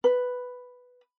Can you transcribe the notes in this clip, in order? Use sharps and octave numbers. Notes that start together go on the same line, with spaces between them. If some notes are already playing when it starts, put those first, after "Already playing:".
B4